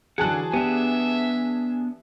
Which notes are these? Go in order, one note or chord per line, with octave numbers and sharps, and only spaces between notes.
D3 E3 F#3 G#4 F#5 A5 F#6
B3 D4 G4 E5